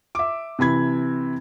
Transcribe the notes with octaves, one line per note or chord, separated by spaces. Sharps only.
E5 D6
C3 E3 B5 G#6